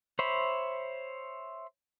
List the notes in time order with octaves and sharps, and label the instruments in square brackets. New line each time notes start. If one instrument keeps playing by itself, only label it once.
[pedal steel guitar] C5 C#5 E5 B5